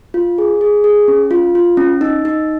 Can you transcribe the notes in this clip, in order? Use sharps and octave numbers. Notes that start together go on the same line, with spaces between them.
F4
G#4
G#4
G#4
C#4
F4
F4
C#4
D#4
D#4